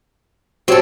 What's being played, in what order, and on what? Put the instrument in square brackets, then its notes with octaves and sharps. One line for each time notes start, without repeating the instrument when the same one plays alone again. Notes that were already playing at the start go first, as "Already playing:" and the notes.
[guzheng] C4 A4 [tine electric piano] F#4 G4 C#5